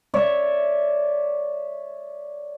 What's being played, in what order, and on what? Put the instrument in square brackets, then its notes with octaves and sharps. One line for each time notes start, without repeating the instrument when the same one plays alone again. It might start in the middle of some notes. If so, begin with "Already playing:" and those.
[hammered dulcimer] C#5 D5 E5